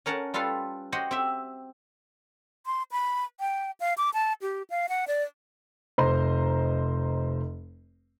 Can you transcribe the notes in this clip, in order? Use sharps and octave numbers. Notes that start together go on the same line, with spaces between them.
C#4 A#4 C#5 F#5 A5
G3 F4 A4 B4 F5
F#4 G4 C5 D#5 F#5
C4 G4 E5
C6
B5
G5
F5
D6
A5
G4
F5
F#5
D5
F1 C5 D#5 A#5 C6